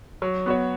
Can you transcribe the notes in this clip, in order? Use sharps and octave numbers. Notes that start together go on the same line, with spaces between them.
F#3
B3 F#4 C#5